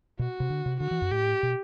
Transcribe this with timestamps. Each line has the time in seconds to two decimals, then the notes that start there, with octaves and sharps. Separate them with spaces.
0.19 B2 F#4
0.40 C3
0.50 D3
0.66 C3
0.80 D3 F#4
0.91 E3
1.02 F#2
1.11 A2 G4
1.43 B2